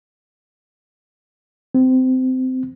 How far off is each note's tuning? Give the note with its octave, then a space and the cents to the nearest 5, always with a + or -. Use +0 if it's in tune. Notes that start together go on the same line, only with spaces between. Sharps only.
C4 -20